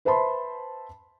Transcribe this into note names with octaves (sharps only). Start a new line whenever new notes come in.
B4 C5 E5 A5 B5 C6